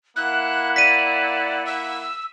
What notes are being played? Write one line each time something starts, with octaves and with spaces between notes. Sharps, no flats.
A#3 E4 F#5 F#6
D5 B6 D#7
E6